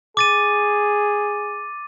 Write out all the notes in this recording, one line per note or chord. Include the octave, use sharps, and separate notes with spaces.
G#4 D6 A6 D#7